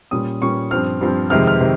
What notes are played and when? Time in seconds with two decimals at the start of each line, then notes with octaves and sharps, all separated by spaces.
0.11 A#2 G3 C#4 D#6
0.42 A#2 G3 C#4 C#6
0.71 G2 F3 C4 F6
1.01 G2 F3 C4
1.30 F2 C3 D#3 G#3 C4 F6
1.47 F6
1.61 C3 D#3